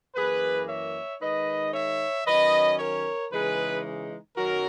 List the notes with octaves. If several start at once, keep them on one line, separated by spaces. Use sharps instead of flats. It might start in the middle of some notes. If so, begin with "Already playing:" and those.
F#2 E3 A#3 G#4 B4
C#5 E5
D#3 G#3 D#4 B4 D#5
C#5 E5
D#3 F#3 C#4 B4 D#5
A#4 C#5
C#3 E3 G#3 D#4 G#4 B4
F#2 D#3 F#3 C#4 F#4 A#4